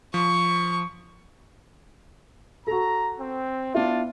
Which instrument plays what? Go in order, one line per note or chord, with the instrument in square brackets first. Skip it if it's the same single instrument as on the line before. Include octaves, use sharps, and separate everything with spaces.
[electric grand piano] F3 [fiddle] C#6
[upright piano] F#4 A4 [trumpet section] A#5
[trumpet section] C4
[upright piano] B3 E4 [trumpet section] D4 F4